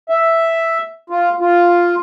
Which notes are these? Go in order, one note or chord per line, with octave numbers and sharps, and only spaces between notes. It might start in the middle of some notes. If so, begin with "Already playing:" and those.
E5
F4
F4